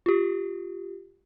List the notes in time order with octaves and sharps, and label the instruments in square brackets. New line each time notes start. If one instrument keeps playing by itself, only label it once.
[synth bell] F4 G4